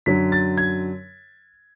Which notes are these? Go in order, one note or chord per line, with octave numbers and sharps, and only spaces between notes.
F#2 D3 F#3 B6
A6
G#6